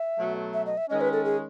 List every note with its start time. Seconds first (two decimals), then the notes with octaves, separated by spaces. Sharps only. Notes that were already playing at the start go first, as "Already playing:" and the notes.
Already playing: E5
0.18 B2 F#3 A3
0.54 E5
0.66 D#5
0.77 E5
0.89 D#3 G#3 C#4 D#5
1.01 B4
1.13 A4
1.25 G#4